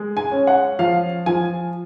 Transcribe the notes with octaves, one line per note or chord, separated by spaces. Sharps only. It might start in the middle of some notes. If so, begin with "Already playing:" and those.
Already playing: G#3
G#5
C#4
F#5
F3 F5
F3 G#5